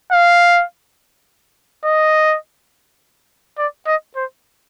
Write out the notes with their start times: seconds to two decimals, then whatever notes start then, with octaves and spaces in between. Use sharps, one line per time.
0.12 F5
1.85 D#5
3.58 D5
3.87 D#5
4.16 C5